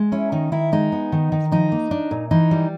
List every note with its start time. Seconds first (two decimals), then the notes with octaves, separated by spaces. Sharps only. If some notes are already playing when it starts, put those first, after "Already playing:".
Already playing: G#3
0.12 C#4 E4
0.32 D#3 D#4
0.52 D#3 E4
0.72 G#3 D#4
0.92 B3
1.12 D#3
1.32 D#3
1.52 F3 D#4
1.72 A#3
1.91 D4
2.11 A#2
2.31 E3 D#4
2.51 G3